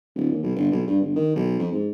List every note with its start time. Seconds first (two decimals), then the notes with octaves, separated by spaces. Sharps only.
0.15 D1
0.31 D#2
0.43 B1
0.56 G1
0.72 B1
0.87 G2
1.01 G1
1.15 D#3
1.36 B1
1.59 F2
1.72 G#2